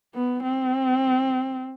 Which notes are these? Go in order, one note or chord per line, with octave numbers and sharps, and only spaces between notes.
B3
C4